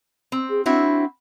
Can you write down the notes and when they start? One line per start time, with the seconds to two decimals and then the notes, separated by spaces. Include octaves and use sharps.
0.32 C4
0.50 G#4
0.66 C4 D4 E4 F#4